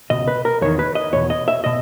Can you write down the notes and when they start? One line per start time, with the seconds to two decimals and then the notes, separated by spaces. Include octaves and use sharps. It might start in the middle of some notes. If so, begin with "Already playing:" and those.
0.10 C#2 B2 D#5
0.28 B4
0.45 A#4
0.62 E2 D#3 C#5
0.79 B4
0.95 D#5
1.13 E2 B2 C#5
1.30 D#5
1.48 E5
1.64 B2 D#5